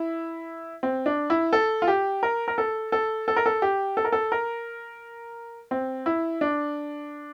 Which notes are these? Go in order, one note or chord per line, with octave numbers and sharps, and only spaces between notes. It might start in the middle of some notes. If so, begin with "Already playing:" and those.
Already playing: E4
C4
D4
E4
A4
F4
G4
A#4
A#4
A4
A4
A4
A#4
A4
G4
A4
A#4
A4
A#4
C4
E4
D4